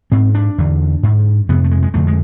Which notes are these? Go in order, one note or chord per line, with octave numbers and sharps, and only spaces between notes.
G#2 C4
D4
E2 D3
G#2
F2 C3 B3
A3
G#3
G#3
F2 D3 A3
G#3